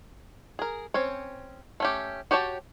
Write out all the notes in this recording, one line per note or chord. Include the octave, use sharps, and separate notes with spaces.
G#4 A#4
C4 C#4 C#5
A3 C#4 G4
F#4 G4 C#5 G5 A5